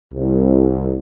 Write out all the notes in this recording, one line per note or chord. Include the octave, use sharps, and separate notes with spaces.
C2